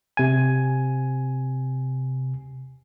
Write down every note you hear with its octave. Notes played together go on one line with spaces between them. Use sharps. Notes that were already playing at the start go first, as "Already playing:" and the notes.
C3 G#5